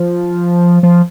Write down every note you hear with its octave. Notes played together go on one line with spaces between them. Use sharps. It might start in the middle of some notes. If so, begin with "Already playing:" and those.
Already playing: F3
F3